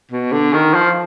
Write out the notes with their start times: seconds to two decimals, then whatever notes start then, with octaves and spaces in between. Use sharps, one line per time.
0.12 B2
0.33 D3
0.53 D#3
0.74 F3